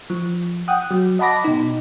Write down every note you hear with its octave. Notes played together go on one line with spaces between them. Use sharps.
F3
F#5 G5 D#6 F#6
F#3
D#5 F#5 A5 B5 D6 A#6
B2 D#4